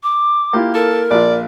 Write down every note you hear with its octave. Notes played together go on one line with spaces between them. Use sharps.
D6
A#3 E4 F4 G4
A4 A#4
A#1 F4 D5